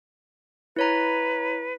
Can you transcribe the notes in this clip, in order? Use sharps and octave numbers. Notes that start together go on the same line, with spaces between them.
E4 B4 C#5 A#5